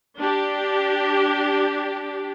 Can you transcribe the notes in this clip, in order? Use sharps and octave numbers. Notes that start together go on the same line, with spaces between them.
D4 G4